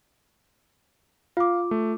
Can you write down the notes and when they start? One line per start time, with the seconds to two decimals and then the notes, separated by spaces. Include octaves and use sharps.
1.37 F4 F5 D6
1.71 A3